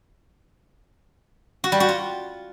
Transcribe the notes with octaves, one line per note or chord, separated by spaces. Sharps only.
F#4
G3
F#4
F4